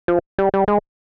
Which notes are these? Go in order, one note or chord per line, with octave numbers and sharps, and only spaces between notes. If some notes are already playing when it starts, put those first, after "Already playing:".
F3
G3
G3
G#3